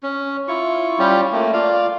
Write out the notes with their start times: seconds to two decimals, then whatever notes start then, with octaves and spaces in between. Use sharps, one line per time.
0.03 C#4
0.48 E4 F4 C#6
0.99 G3 C#4 F4 G4
1.33 A3 A#3
1.53 F4 D5 F5